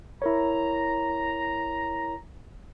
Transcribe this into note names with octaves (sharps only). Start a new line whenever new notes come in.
E4 A#4 C#5 A#5